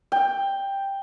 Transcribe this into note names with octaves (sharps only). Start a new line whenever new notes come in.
G5